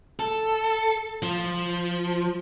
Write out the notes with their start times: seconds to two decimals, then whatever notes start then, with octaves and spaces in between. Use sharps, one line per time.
0.19 A4
1.22 F3